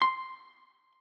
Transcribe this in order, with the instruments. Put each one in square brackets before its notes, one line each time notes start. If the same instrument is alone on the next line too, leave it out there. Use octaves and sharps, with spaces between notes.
[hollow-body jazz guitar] C6